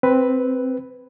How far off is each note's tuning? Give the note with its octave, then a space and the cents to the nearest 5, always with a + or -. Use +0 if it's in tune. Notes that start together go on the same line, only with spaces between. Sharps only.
C4 +0 B4 +5